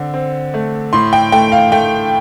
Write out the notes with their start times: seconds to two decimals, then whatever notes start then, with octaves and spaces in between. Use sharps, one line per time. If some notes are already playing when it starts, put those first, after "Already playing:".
Already playing: D3 C4
0.14 C4
0.54 A3
0.93 A2 C6
1.13 G5
1.32 A3 G5
1.52 F5
1.72 A3 G5